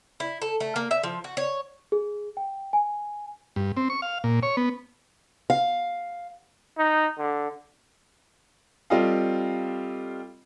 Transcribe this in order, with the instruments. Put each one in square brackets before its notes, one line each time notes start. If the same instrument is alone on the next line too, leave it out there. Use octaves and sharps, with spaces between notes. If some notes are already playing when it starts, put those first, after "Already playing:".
[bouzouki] E4
A4
A3
A#3
E5
F3
F#4
C#5
[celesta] G#4
G5
G#5
[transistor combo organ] G2
C4
C#6
F5
A#2
C#5
B3
[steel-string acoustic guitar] F5
[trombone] D#4
D3
[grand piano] G3 C4 F4 A4 D#5 F5